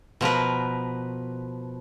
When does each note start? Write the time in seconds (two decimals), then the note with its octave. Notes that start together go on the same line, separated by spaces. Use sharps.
0.21 B2 F3 A#4 B4